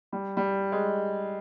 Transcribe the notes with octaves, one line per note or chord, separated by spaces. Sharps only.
G3
G3
G#3